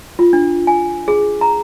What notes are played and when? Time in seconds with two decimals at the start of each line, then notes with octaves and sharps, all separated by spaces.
0.19 F4
0.33 D4
0.67 G#5
1.08 G#4
1.41 A#5